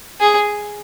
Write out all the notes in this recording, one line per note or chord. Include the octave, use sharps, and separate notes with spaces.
G#4